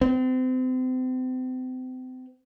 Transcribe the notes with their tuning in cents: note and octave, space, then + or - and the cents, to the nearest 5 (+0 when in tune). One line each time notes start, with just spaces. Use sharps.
C4 -35